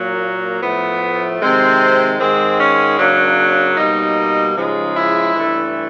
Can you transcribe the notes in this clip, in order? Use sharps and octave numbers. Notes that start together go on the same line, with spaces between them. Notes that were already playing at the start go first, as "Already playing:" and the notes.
Already playing: A#2 F#3 A#3
A2 F3 A3 B3
C3 D#3 G#3 C4
G#2 D#3 G#3 C4
C#4
C#3 F#3 A#3 D4
B2 G3 A#3 D#4
C#3 F3 G#3 D#4
E4
G2 E3 A3